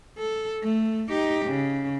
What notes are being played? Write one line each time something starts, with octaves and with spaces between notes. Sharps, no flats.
A4
A3
D#4 G4
C#3